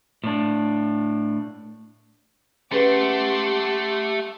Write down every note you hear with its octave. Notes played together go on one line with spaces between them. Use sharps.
A2 D4
A3 C#4 G4 G#4 B4 F#5 C6 D6